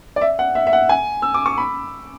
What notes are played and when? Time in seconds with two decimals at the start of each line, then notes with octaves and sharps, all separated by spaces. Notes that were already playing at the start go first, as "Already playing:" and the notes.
0.16 D5
0.21 E5
0.39 F#5
0.55 E5
0.67 E5
0.73 F#5
0.89 G#5
1.22 E6
1.34 D6
1.46 C#6
1.58 B5